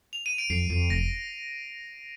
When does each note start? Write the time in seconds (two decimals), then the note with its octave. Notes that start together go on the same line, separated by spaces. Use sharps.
0.13 F7
0.26 D#7
0.38 D7
0.50 F2 C7
0.70 F2
0.90 F1 A#6